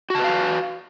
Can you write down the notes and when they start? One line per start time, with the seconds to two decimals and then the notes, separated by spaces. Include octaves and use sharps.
0.10 F#4
0.15 A5
0.20 B4
0.24 F5